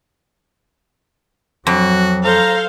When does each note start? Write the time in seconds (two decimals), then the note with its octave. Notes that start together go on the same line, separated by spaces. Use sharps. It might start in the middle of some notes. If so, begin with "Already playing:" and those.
1.67 F2 F#3 F#4
2.24 A4 C5 F5 A#5